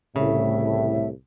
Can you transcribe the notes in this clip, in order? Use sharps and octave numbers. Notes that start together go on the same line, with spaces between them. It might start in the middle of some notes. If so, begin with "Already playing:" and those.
C2 A2 C#3 E5